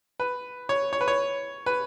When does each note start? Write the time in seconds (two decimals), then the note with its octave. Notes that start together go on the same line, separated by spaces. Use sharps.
0.20 B4
0.69 C#5
0.93 C#5
1.01 B4
1.08 C#5
1.66 B4